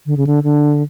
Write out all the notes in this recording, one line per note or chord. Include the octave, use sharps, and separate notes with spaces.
D3
C#3
D3
D3